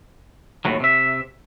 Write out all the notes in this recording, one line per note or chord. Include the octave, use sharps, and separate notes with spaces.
D#2 A2 F#3
C3 E5